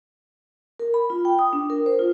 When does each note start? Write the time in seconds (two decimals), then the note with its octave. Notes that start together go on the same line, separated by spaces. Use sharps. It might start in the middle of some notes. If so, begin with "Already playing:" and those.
0.80 A#4
0.94 B5
1.10 F4
1.25 G5
1.39 D#6
1.53 D4
1.70 A#4
1.86 C5
1.99 F4